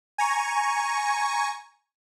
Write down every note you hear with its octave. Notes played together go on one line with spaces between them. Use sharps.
G#5 A#5 C#6